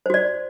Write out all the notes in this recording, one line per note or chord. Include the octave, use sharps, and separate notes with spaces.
F#4 C5 D5